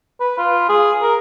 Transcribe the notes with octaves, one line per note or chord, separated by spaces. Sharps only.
B4
F4
G#4
A#4